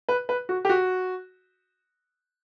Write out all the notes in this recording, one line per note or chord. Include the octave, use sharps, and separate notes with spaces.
B4
B4
F#4
G4
F#4